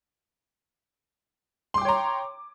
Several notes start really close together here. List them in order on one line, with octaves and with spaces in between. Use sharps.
C6 D6 G5 C#5 A#5